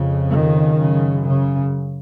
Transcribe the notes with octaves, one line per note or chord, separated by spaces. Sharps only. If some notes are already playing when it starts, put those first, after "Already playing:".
Already playing: F2 C#3
D#3
F#2 C#3
C#3